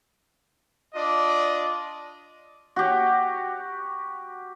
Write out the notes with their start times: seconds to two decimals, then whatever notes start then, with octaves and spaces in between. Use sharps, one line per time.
0.94 D4 F4 D5 D#5
2.76 F#4 G4